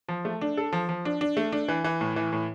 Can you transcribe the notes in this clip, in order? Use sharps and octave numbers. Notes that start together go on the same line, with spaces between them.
F3
A3
D4
A4
F3
F3
D4
D4
A3
D4
E3
E3
A2
E3
A2